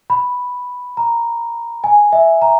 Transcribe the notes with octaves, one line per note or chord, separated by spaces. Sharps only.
B5
A#5
G#5
E5
A#5